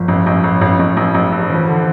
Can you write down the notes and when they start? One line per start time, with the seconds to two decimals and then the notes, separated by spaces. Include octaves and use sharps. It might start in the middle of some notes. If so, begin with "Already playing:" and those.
Already playing: G1 F3
0.08 A1
0.27 A1
0.44 A1
0.61 A1
0.79 A1
0.97 A1
1.14 A1
1.32 G2
1.50 E3 F3
1.68 D3